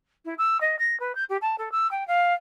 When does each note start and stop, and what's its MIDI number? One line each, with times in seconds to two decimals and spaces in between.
0.25 0.34 64
0.38 0.60 88
0.60 0.76 75
0.79 0.98 94
1.00 1.15 71
1.15 1.24 91
1.29 1.37 67
1.41 1.56 81
1.58 1.71 69
1.72 1.89 88
1.91 2.06 79
2.07 2.33 77